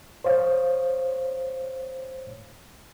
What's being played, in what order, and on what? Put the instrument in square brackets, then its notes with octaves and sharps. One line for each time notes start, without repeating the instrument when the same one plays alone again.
[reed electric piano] C5 C#5 F5